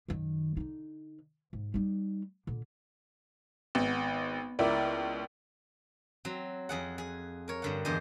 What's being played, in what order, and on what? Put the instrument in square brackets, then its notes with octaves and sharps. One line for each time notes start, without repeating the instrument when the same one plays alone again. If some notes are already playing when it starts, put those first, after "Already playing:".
[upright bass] F#2 D#3
D3 D#4
G#2
G3 D#4
A#2 D3
[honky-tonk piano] G#1 [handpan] B3
[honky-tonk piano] C#2 E4 [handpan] A#4 D5
[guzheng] F#3 C4
F2 G#4 F#5
G#4
A#4 C#5
G2 D3 F#5
E2 G2 G#4 C5 D#5